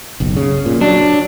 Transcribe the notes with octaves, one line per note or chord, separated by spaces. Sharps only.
F#1 B1
C#3
A#2
F#3 D4